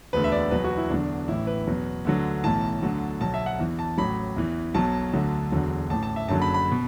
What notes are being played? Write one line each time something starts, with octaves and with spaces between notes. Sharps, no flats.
E1 D2 D3 B4
E5
D5
E1 E2 B2 F#3 B4
F#4
E4
E1 E2 D3 F#3 D4
A1 A2 E3 E4
B4
E2 B2 F#3
D2 D3 F#3
B1 A2 E3 A5
D2 D3 F#3
B1 B2 F#3 A5
E5
F#5
E2 E3
A5
A1 A2 F#3 B5
E2 E3
B1 B2 F#3 A5
D2 D3 F#3
E1 E2 D3 F#3
A1 A2 E3 A5
A5
E5
F#1 F#2 D3 F#3 A5
B5
B5
B2